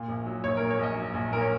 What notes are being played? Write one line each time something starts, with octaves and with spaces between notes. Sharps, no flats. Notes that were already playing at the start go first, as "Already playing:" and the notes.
Already playing: A#2
A#1
F#3
A#1 C#5
A#4
A#2
C#5
A#1 D#5
F#3
A#1
A#2 A#4
C#5